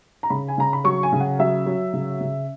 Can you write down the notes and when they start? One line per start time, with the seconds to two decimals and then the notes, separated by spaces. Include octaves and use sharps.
0.23 A#5
0.30 C#3 B5
0.48 G#5
0.58 C#3 A#5
0.73 B5
0.84 F#3 C#6
1.03 G#5
1.12 C#3
1.20 F#5
1.39 F#3 E5
1.66 F#3
1.93 C#3
2.21 C#3